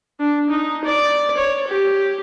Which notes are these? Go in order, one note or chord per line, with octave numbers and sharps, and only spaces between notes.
D4
D#4
D5
C#5
G4